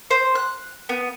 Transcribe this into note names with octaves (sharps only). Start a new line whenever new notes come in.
C5
F#6
B3